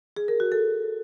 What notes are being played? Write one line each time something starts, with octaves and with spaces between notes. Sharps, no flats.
G#4
A#4
F#4
A4